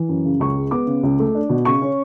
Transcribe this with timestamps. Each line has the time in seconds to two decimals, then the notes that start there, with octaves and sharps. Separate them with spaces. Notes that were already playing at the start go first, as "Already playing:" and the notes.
Already playing: E3
0.09 F#2
0.25 C#3
0.40 C#2 C#6
0.56 G#3
0.71 B3 D6
0.87 C#3
1.03 C#2
1.19 A3
1.35 D4
1.49 B2
1.65 C#3 C#6
1.82 C#4